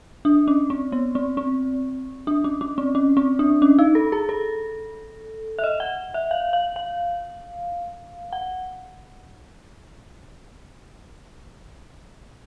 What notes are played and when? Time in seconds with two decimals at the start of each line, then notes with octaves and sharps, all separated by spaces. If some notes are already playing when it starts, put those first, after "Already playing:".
0.25 D4
0.48 C#4
0.70 C4
0.92 B3
1.15 C4
1.37 C4
2.27 D4
2.44 C#4
2.61 C#4
2.78 C4
2.95 C#4
3.17 C4
3.39 D4
3.62 C#4
3.79 D#4
3.95 A4
4.12 G#4
4.29 A4
5.59 E5
5.64 D#5
5.80 F#5
6.14 E5
6.31 F5
6.53 F5
6.76 F5
8.33 F#5